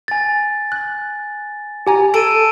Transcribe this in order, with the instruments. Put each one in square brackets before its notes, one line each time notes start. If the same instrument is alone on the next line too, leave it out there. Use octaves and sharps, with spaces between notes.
[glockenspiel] G#5 A6
[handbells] F#6
G4 G#5 A#5
[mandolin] A4 [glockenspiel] D7 D#7